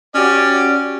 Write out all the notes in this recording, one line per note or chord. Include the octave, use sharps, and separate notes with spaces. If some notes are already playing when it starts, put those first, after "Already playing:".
C#4 F#4 G4 D5